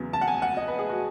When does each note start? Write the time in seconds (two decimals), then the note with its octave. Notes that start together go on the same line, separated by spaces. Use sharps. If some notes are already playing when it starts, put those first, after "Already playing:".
Already playing: E2 C#3 F#3 B3
0.13 A5
0.21 F#5
0.28 G#5
0.42 F#5
0.57 D#5
0.68 B4
0.79 G#4
0.89 F#4